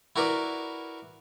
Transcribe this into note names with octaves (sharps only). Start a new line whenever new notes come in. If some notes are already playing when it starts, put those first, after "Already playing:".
E4 F#4 A#4 B4 D5